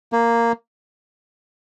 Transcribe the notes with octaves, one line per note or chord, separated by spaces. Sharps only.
A#3